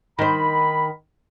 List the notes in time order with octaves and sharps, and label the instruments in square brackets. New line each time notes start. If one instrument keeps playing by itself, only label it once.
[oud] D#3 C5 [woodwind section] B5